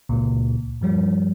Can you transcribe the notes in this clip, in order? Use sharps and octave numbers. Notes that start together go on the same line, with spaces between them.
C#2 A#2
G2 F3 G3